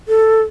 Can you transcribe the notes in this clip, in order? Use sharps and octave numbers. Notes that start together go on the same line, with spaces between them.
A4